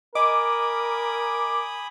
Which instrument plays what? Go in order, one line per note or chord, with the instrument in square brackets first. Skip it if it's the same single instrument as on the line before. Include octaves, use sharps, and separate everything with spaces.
[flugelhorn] A#4 [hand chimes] D#5 [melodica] G#5 B5 D#6 [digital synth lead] D6